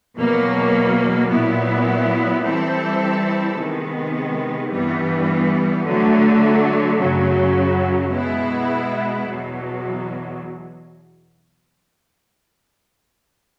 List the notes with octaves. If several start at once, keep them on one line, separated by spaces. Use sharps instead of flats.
E2 B2 F#3 A#3
A#2 F#3 B3 E4
E3 G3 C4 E4 A4
C3 D#3 G#3 B3
G2 E3 G3 B3
D3 F#3 A3
F#2 C#3 F#3
B2 G#3 B3 E4
E2 B2 F#3